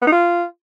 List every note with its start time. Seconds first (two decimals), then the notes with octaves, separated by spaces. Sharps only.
0.02 B3
0.07 D#4
0.12 F4